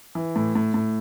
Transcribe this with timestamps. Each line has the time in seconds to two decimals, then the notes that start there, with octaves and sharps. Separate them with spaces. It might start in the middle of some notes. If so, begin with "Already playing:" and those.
0.15 E3
0.36 A2
0.55 A2
0.74 A2